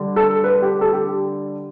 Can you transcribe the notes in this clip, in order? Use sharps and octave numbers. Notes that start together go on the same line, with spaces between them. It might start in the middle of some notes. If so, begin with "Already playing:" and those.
Already playing: D3 G3
A4
B4
G4
A4
G4